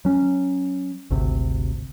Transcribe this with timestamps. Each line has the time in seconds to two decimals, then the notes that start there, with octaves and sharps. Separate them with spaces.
0.05 F#3 C#4
1.10 G#1 D2 C3